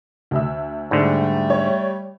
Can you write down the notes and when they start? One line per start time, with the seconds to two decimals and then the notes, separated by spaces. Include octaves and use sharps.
0.31 D2 E5 E6
0.91 G#2 D3 G3 A3
1.50 C#5